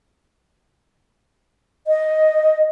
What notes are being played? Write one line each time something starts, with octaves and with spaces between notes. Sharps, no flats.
D#5